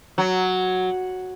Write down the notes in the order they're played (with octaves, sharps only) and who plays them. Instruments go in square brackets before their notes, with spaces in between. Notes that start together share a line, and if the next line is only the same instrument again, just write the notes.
[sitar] F#3